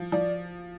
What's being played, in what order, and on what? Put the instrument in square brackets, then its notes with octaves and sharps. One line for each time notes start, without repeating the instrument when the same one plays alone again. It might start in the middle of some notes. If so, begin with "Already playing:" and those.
Already playing: [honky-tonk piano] F3
[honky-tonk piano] F3 [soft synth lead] D5